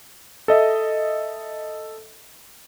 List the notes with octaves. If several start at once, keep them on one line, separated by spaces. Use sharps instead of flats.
A4 D#5 E5